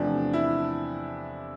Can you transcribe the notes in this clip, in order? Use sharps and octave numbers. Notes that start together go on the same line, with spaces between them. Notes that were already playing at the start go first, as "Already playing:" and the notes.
Already playing: E2 C3 F3 A3 D4
E4